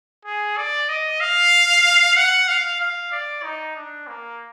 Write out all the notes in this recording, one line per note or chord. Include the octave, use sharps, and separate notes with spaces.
G#4
D5
D#5
F5
F#5
F5
F5
D5
D#4
D4
A#3